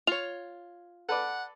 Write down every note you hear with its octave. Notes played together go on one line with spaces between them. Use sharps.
F4 C#5 F7
A4 B4 D5 F#5